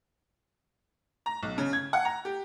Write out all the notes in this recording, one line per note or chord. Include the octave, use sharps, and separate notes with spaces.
A#5
B1
C#3
G#6
F#5
A#5
G4